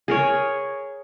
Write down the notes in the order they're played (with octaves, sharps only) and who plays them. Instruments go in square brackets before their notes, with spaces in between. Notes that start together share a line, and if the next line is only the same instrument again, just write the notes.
[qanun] G#4 A#4 C#5